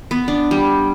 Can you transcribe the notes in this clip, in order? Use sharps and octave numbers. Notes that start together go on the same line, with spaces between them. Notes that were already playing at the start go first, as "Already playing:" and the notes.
B3
D4
G3